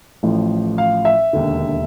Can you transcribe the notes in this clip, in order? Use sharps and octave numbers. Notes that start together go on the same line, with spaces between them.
A1 A2 F3
F5
E5
E1 D#2 D3